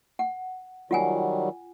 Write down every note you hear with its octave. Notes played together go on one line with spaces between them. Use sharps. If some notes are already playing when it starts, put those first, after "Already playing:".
F#5
D#3 F#3 G3 F4 F#5 G#5